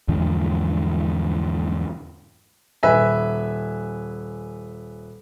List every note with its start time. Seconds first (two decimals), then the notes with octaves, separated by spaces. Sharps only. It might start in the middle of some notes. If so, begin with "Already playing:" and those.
0.08 E2 G#2 D3 F3
2.83 D#1 B4 E5 G#5